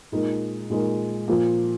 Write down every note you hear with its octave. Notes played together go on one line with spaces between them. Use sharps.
A#2 G#3 D#4 A#4
A#2 G#3 D#4 A#4
A#2 F3 A#3